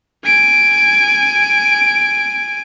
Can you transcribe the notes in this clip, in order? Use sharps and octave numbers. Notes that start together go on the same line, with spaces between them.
G#5 D7